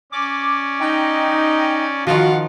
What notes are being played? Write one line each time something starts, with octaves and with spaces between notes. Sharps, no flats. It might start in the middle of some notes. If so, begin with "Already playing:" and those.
C#4 D5 D6
D#4 G5
D#3 F3 F4 F#4 F#5